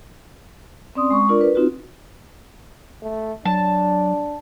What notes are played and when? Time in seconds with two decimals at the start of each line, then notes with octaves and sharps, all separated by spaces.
0.95 C4 C#4 D5 C6 D#6
1.10 G#3 C#6
1.29 D4 F4 A#4 D5
1.41 B4
1.55 C4 D#4 F4 F#4
3.03 A3
3.45 F#3 D4 A5